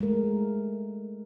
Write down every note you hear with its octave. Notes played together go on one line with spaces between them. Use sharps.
G#3 A3 A#4